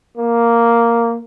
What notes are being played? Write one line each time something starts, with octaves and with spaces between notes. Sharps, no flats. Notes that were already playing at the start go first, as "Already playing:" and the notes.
A#3